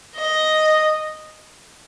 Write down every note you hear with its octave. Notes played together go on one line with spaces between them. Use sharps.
D#5